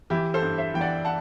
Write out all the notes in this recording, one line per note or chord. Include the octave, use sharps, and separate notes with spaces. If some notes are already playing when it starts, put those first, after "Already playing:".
E3 E4 G4
A4 C5
G2
C5 E5
E3 G5
D5 F#5
F#5 A5